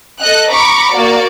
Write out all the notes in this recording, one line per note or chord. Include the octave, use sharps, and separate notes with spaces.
A4 D#5 F#6
A#5 B5 C#6 D6
A#3 F#4 D5